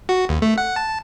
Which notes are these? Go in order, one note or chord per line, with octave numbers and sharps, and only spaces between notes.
F#4
D#2
A3
F#5
A5